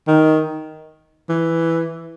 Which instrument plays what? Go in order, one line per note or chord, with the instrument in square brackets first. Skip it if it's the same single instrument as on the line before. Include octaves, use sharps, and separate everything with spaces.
[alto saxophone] D#3
E3